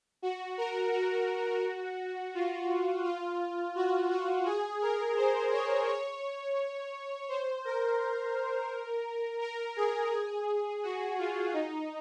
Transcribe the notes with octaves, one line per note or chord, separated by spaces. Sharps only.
F#4
A#4
F#4
F4
F4
F#4
F#4
G#4
A#4
C5
C#5
C#5
C5
A#4
A#4
G#4
G#4
F#4
F4
D#4